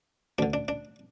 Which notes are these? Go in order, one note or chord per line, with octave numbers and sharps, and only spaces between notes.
D2 D3 D4
D4
D4